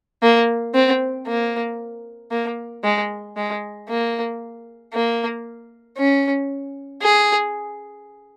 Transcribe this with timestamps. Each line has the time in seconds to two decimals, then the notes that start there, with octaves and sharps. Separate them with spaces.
0.23 A#3
0.74 C4
1.27 A#3
2.31 A#3
2.84 G#3
3.37 G#3
3.89 A#3
4.94 A#3
5.98 C#4
7.03 G#4